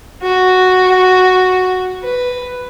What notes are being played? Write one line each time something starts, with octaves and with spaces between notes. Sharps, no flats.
F#4
B4